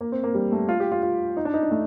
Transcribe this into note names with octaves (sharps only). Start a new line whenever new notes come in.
A#3
C4
A#3
G3
A3
F4
G4
F4
F4
D#4
D4
D#4
D4
A3